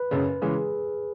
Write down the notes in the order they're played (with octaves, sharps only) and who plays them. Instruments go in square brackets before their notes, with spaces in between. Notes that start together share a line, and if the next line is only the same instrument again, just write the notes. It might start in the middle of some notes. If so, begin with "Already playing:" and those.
Already playing: [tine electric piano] B4
[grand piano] F#1 F#2 C#3
[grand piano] C#3 E3 G#3 [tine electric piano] G#4